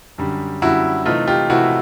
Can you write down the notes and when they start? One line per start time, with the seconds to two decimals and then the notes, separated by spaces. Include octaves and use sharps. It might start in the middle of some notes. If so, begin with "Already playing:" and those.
0.18 F#2 D3 G3
0.62 F#2 D3 G3 E4 F#4
1.05 C3 E3 A3 D#4 F4
1.27 F4 G4
1.50 C3 E3 A3 E4 F#4